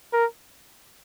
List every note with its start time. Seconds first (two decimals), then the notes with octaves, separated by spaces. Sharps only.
0.13 A#4